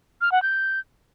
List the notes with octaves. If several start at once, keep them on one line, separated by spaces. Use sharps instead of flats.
F6
F#5
G6